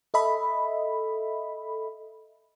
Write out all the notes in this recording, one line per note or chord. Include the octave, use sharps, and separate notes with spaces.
A4 D#5 E5 B5